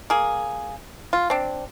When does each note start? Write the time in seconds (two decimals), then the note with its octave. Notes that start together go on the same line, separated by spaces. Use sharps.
0.10 A#3 G#4
1.13 F4
1.30 C4 D4